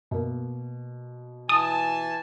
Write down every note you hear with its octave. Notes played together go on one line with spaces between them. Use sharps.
B2 A#3
E3 G#5 A5 D#6